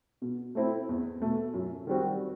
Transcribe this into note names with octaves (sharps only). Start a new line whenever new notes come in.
B2
A3 C4 E4
E2
B2 A3
F#2
D#3 G3 C4 F#4